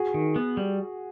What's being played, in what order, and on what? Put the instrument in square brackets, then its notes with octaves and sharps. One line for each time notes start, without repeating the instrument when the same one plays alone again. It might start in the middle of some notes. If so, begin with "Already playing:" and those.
Already playing: [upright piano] F#4 G#4
[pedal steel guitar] D#3
B3
G3